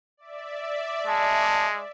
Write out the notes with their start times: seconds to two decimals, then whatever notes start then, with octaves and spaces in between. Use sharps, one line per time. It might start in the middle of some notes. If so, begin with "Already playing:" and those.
0.17 D5 E5
1.07 G#3 A5